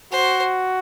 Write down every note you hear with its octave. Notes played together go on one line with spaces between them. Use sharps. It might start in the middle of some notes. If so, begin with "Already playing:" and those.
F#4 C5